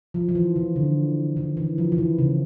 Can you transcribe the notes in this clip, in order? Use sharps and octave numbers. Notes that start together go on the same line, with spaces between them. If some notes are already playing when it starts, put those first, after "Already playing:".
F3
F3
E3
D#3
D3
D#3
E3
F3
E3
D#3
C#3